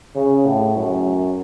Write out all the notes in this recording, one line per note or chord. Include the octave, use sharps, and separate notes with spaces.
C#3
A2
F#2